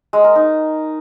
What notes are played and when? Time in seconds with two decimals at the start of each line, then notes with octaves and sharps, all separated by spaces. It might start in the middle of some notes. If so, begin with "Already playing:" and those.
0.13 G#3
0.24 A#4
0.35 D#4